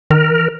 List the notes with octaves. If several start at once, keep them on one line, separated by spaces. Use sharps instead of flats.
D#3 A#4
E3